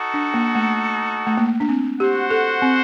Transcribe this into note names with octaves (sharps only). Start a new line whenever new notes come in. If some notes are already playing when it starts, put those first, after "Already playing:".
Already playing: D#4 F#4 A4
D4
A#3
A3
A3
A#3
D4
C4
F#4 G4 C5 F#5
A4
C4